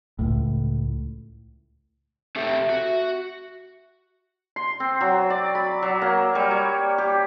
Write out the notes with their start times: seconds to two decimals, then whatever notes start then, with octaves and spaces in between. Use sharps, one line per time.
0.19 C#2 A2
2.36 C4 G4 A4 E5
2.69 F#4
4.56 C6
4.80 C4
5.01 F#3
5.30 D5
5.55 B5
5.82 F#3
6.02 A#3
6.35 G3
6.51 C#5
6.98 G4